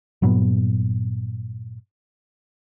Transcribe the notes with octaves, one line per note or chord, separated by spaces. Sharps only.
G2 A#2 F#3 B3